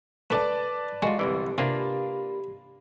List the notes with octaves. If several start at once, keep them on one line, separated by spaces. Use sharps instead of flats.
A3 D4 B4 D5 A5
G#3 F4 F#4
G1 C2 E3 G4
C3 A#3 D4 F4 G4 B5